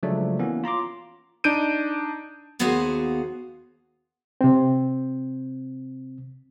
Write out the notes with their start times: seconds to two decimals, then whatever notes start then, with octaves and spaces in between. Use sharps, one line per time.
0.03 C#3 F3 F#3 G#3 A3 D4
0.39 E3 A#3 B3 C#4
0.64 F4 A#5 C6 D6
1.44 D4 D#4 G6 D7 D#7
2.59 D#2 B3 F#4 G#4 C5 F5
4.41 C3 C4